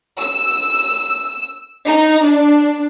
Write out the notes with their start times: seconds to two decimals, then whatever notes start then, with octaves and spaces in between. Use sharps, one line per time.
0.20 E6
1.86 D#4
2.24 D4